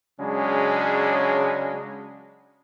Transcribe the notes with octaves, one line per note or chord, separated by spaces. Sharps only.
C#3 F#3 G#3 C#4 D4